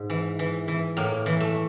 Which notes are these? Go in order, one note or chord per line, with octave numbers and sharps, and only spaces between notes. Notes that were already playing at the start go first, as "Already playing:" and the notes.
Already playing: G#2
E3
E3
E3
A2 A#3
E3
A3